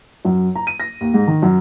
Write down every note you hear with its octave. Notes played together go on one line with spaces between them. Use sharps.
F#2
A#5
D#7
A#6
D#2
G#2
D#3
F#2